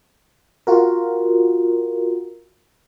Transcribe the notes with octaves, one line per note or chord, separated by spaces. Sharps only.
F4 F#4 A#4